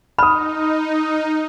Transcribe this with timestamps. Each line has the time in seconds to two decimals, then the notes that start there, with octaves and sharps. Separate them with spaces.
0.18 D#4 B5 D#6 F6